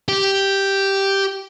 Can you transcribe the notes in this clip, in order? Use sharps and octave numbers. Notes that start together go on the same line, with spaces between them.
G4